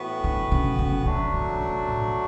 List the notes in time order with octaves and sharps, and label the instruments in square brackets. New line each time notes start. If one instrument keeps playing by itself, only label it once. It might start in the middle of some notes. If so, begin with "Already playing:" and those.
Already playing: [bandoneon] A2 E3 B3 F#4 B4
[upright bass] D3
C#3
C#3
[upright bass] D3 [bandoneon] F#3 A3 D4 F#4
[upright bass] D3
C#3
A2